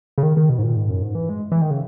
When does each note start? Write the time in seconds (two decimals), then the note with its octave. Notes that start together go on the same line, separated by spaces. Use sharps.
0.18 C#3
0.23 D#3
0.37 D#3
0.49 B2
0.58 G#2
0.63 A#2
0.76 G#2
0.89 F#2
1.02 G#2
1.15 E3
1.29 G#3
1.52 E3
1.62 D#3
1.71 C#3